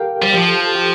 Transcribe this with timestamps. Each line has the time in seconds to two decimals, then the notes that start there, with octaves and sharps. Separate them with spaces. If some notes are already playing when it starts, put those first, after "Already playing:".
Already playing: G4 A4 A#4 F5 G5
0.22 G3 C5
0.34 F3 G4
0.48 A4
0.61 A4
0.75 G4